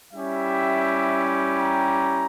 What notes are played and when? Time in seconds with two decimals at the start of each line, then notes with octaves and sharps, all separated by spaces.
0.13 G3 C#4 E4 G4 E5
1.59 A#5